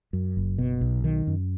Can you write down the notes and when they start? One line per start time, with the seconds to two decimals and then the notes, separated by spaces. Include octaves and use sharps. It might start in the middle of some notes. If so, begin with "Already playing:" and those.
0.13 F#2
0.37 F#1
0.58 B2
0.81 B1
1.04 D#3
1.27 F#2